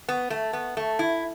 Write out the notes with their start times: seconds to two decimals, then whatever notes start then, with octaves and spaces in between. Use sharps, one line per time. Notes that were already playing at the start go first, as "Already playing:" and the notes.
0.08 B3
0.30 A3
0.53 B3
0.77 A3
0.99 E4